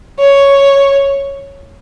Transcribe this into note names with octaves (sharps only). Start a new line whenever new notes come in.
C#5